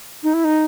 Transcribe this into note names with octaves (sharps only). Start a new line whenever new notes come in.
D#4
E4
D#4